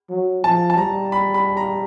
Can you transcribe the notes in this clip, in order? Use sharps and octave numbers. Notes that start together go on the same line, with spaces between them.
F#3
F3 A5
A5
G3 A#5
B5
B5
A#5